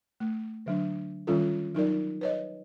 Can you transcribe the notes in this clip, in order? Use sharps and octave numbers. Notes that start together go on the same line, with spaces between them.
A3
D3 F#3 D4
D#3 G3 C#4 F4 A4
F#3 D#4 A#4 D5
B4 C#5 D#5